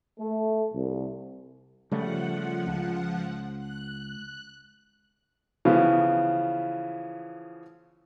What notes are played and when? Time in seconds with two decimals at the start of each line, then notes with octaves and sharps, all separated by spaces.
0.20 A3
0.74 C2
1.91 C#3 F3 G3 A3 F#5
2.67 C#2
3.58 F#6
5.65 C#3 E3 F3 B3